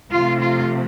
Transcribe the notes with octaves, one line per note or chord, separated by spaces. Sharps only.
C3 F3 A3 F4
F4